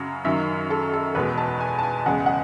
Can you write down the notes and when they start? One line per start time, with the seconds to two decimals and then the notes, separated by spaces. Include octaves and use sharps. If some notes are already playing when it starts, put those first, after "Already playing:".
Already playing: F#2 C#3 F#3
0.25 F#2 D#3 F#3 E5
0.70 A4
0.94 A4
1.15 E2 B2 G#3 B4
1.38 A5
1.60 G#5
1.79 A5
1.83 G#5
2.06 E2 C#3 G#3 F#5
2.26 F#5